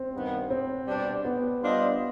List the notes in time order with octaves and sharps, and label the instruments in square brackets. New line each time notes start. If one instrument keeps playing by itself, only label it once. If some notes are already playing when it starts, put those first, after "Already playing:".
Already playing: [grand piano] C4
[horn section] G2 D#3 B3
[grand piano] C4
[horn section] B2 G3 D4
[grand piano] B3
[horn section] G3 D4 F4 C5 D#5